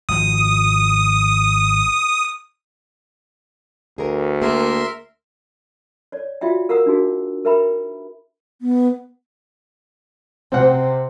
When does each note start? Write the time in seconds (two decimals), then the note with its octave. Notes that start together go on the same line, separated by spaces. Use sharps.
0.09 G#1 F3 D#6
3.98 D2 G#4 A#4
4.42 A#3 G#4 A#4 E5 C6
6.12 C#5 D5
6.41 F4 F#4 D5 E5 F5 G5
6.69 A#4 F5 F#5 A#5 D#6 E6
6.86 D4 D#4 F#4 G#4
7.45 A#4 B4 E5 G5 A#5 B5
8.62 B3
10.52 C3 C4 F#5